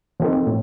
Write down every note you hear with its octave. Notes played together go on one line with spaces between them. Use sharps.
F3 C4 D#4 A4
A2